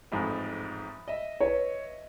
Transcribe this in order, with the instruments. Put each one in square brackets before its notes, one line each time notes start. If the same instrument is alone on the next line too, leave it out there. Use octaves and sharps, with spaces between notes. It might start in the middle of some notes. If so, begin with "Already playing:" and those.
[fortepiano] A1 F2 G#2 [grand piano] B5
[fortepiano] D#5 E5
[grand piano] B4 C#5